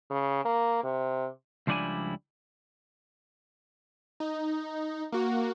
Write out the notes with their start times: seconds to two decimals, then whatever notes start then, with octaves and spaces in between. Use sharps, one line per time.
0.11 C#3
0.45 A#3
0.84 C3
1.67 C#2 F3 G3 D4 E4 G#5
4.20 D#4
5.12 A#3 F#4